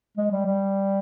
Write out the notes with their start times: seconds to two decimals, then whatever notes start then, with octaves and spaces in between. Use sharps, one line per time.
0.17 G#3
0.31 G3
0.46 G3